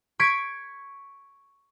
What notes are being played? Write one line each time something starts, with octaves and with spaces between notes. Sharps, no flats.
C#6 G#6 B6 D7